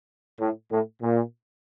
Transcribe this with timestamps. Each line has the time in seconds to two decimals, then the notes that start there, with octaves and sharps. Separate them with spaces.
0.40 A2
0.71 A2
1.02 A#2